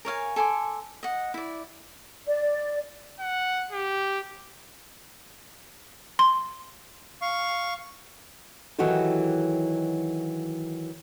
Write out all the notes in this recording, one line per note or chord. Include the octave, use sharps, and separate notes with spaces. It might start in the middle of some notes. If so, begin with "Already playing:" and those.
A#4 C#5 F5 G#5
A4 G#5 C6 D6
D#5 F#5
E4 D5
D5
F#5
G4
C6
F5 C#6
D#3 E3 F#3 F#4 G4 A4